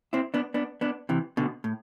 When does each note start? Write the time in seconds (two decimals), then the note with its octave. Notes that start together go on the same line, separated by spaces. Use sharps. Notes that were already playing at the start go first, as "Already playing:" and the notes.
0.13 C4 E4
0.34 B3 D4
0.54 B3 D4
0.81 B3 D4
1.09 C3 E3
1.37 B2 D3
1.64 A2